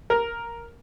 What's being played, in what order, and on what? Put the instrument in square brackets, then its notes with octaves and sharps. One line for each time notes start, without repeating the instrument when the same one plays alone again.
[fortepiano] A#4